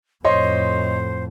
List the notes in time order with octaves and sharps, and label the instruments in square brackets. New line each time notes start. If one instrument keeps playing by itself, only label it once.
[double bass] F2 A2 [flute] C5 [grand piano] C#5 D#5 C6